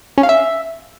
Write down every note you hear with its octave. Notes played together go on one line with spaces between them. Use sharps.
C#4
F5
E5